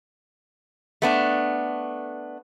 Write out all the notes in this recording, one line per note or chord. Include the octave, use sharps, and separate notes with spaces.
A3 B3 D4